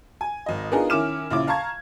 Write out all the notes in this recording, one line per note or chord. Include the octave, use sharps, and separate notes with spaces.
G#5
G#1 D#5
B3 D4 D#4 F4 G#4 A#4
D#3 C#4 E4 D6 F6 E7
A#1 C#3 E4 D6
F5 A5 A#5 C#6 G#6